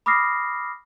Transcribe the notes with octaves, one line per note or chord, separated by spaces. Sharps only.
B5 D6 D#6 F6 A#6 C7